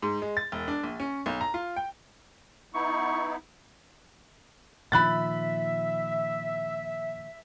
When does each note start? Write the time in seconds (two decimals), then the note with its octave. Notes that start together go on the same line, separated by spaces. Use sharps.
0.02 G#2
0.22 G#3
0.37 A6
0.52 E1
0.68 D4
0.83 A#1
1.00 C#4
1.26 B1
1.41 A#5
1.54 F4
1.76 G5
2.74 B3 D#4 E4 C#6
4.92 A#2 D#3 F3 E5 B5 F#6 A6